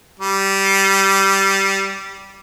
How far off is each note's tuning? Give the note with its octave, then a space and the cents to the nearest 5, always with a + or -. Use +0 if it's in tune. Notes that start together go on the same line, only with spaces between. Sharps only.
G3 -10